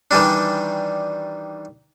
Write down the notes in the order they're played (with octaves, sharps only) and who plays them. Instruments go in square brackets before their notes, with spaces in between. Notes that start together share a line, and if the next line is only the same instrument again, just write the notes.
[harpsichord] D#3 E3 G3 D4